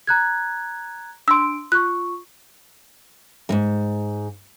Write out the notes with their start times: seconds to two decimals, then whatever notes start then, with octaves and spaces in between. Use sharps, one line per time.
0.07 A#5 F#6 G#6
1.28 D4 C6 E6 D7
1.72 F4 C#6 F#6
3.49 F2 G#2